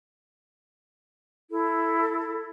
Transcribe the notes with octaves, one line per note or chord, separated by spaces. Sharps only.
E4 A4